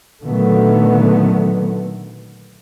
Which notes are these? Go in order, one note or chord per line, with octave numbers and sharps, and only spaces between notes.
A#2 D3 D#3 F#3 A3 B3